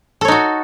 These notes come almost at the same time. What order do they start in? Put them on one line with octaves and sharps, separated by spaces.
A4 C#5 D#4 F#4